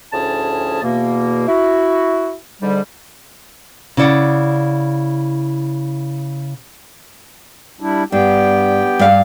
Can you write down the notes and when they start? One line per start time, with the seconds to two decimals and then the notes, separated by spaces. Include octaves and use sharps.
0.13 D2 A2 F3 C#4 G#4 A5
0.83 E2 B2 A#3
1.48 E4 F#4
2.62 G#2 D3 G3
3.97 C#3 E4 D5 F#5
7.81 G3 D4 E4
8.12 G2 B3 G4 G5
8.99 G2 F5